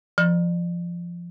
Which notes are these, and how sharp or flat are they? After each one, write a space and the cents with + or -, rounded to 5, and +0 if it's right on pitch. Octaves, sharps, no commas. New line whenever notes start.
F3 -15